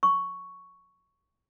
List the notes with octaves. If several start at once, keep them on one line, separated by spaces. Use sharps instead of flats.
C#6